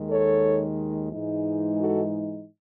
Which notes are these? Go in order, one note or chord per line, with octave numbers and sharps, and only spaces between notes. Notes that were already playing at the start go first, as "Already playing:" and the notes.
Already playing: D#2 D#3 G#3
A4 C#5
G#2 E3 G#3 D#4
F#4 A4